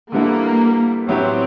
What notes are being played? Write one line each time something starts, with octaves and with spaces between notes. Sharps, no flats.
D3 G3 A#3 B3 E4 A4
A2 F#3 B3 C4 E4 G4